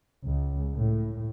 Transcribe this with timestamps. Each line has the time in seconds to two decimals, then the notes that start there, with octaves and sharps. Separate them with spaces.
0.25 C#2
0.76 A2